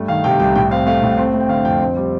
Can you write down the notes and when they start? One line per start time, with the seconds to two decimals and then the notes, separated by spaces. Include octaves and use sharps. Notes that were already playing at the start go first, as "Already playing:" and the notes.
Already playing: G2 A3
0.08 D#3 F5
0.24 C3 G5
0.40 C2 G5
0.55 A2 G5
0.71 C4 F5
0.87 A3 F5
1.02 A2
1.18 C4
1.34 A3
1.40 G5
1.49 D3 F5
1.65 F2 G5
1.81 C4
1.96 G3